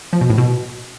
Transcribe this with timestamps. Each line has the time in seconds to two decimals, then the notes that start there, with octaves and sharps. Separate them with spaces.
0.13 F3
0.21 B2
0.30 A2
0.38 B2